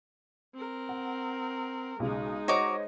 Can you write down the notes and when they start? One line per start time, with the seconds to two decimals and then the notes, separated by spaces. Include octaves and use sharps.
0.54 C4 A#4
0.89 F#5
2.00 B1 C#3 G#3 D#4
2.48 F#4 C5 C#5 D#5 A#5 D6